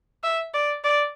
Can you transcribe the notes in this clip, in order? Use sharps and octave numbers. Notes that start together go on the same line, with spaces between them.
E5
D5
D5